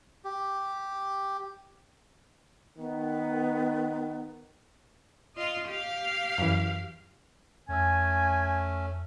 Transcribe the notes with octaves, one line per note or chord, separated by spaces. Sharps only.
G4
D#3 B3
F4 D#5
G4 F5
F#2 E3
F2 A3 C#4 G#5 E6